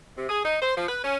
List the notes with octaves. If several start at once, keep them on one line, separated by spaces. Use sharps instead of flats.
C3
G#4
D#4
C5
F3
B4
C#4